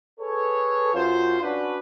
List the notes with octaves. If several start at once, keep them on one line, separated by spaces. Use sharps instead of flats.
G#4 A4 B4 C#5
F#2 F4 C5
C#4 D4 F#4 B4